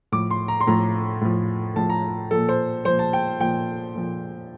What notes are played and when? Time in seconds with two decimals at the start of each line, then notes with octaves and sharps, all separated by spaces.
0.12 A2 F3 D6
0.31 C6
0.48 A#5
0.61 C6
0.67 A2 F3 A#5
1.21 A2 F3
1.76 A2 F3 A5
1.89 A#5
2.31 A#2 F3 A4
2.49 C5
2.85 A#2 F3 C5
2.99 A5
3.13 G5
3.40 A#2 F3 G5
3.95 A#2 F3